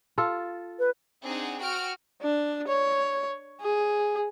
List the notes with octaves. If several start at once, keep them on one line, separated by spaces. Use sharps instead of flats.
F4 A4
B4
C4 D4 D#4 G#4 F#5
F#4 G5 F6 D7
D4
C#5
G#4